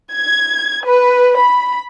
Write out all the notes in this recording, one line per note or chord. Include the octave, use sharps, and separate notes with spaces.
G#6
B4
B5